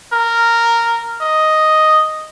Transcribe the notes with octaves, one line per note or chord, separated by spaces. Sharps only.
A#4
D#5